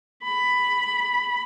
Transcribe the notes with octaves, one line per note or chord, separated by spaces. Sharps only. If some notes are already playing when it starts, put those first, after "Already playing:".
B5